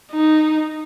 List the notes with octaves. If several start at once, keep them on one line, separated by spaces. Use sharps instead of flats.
D#4